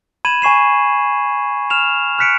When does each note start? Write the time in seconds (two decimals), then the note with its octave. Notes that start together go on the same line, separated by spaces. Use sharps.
0.25 B5 G#6 D#7 E7 F#7
0.42 G#5 C#6 C7 E7
1.70 F6 E7 F7
2.19 F6 F#6 B6 C#7 D7